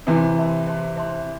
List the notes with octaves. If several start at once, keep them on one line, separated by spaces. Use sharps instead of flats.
C3 E3 C5 E5 A5 C6
C5 E5 A5 C6
C5 E5 A5 C6
C5 E5 A5 C6